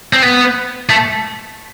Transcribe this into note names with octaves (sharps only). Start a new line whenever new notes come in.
C4
B3
A3